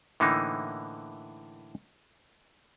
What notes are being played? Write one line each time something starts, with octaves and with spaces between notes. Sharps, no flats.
A2 D3 E3 A#3 D#4